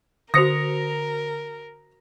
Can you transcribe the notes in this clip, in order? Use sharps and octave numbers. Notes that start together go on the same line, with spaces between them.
D3 F#4 A#4 C5 D#6 A#6 C#7 F7